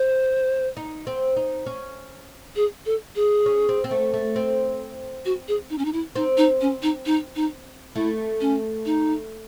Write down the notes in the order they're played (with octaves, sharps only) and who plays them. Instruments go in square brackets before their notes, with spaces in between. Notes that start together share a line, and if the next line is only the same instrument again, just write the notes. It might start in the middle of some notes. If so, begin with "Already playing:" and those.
Already playing: [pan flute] C5
[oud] D#4
C4
D#4
C#4
[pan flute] G#4
A4
G#4
[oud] C#4
C4
C4
A3
A3
C4
[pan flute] F#4
G#4
D#4
C#4
D#4
E4
[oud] C4 [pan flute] D#4
[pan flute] D#4
C#4
D#4
D#4
D#4
[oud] A3 [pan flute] E4
[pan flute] C#4
D#4